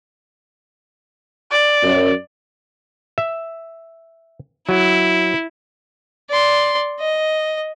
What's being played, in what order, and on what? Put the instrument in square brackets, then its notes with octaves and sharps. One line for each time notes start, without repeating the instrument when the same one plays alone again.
[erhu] D5
[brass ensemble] F#2
[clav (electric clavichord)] E5
[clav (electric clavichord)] F#3 [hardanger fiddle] E4
[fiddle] D5 C6
D#5